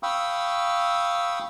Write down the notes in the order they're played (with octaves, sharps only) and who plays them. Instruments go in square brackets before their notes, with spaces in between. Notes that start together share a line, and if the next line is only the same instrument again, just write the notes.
[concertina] F5 G5 B5 C#6 D#6 E6